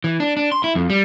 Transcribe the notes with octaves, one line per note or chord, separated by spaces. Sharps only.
E3
D4
D4
C6
E4
F2
G3